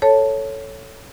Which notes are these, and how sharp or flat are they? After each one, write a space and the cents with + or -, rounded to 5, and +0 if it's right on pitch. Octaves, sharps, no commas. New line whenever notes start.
A4 +0 C#5 +0 A5 +0